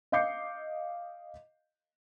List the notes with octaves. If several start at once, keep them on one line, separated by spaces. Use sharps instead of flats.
D#5 F5 D6 G6 C7 C#7